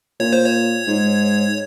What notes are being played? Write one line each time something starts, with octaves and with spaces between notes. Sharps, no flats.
A#2 C#5
C5
C#5
G#2